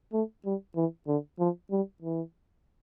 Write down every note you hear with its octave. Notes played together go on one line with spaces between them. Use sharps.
A3
G3
E3
D3
F3
G3
E3